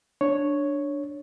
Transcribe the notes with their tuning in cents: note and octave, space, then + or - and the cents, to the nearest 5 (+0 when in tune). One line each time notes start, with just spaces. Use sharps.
D4 +0 C#5 +0